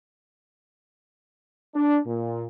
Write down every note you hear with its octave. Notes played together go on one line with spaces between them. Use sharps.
D4
A#2